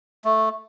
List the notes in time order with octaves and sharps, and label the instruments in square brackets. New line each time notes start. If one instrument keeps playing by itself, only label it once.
[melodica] A3